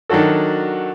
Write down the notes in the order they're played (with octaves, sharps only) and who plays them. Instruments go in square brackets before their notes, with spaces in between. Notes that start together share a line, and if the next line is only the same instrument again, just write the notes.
[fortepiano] D#3 F#3 D4 F#4 A4